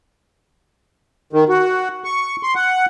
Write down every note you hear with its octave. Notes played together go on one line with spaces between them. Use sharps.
D#3
F#4
C#6
C6
F#5